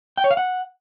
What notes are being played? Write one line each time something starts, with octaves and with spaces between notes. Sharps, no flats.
G5
C#5
F5
F#5